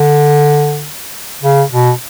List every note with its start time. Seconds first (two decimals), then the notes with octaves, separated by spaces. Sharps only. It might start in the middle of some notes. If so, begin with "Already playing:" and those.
Already playing: D3
1.42 C#3
1.71 B2